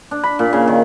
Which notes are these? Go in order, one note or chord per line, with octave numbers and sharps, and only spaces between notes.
D4
B5
A#2
C#3
D#3